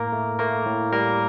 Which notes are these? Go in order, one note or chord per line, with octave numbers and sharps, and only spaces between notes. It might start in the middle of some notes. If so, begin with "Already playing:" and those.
Already playing: A2 A#3 A#4
A3
A3 A#3 A#4
A2
G3 A#3 A#4